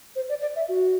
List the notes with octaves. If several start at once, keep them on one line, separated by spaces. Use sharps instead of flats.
C5
D5
D5
E5
F#4